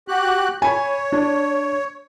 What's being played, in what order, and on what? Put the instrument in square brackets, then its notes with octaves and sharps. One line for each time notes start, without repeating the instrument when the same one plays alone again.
[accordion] F#4 G4 F#6
[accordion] C#5 [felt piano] G#5 B5
[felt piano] D4